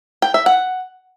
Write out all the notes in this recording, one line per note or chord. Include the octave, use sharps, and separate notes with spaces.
G5
E5
F#5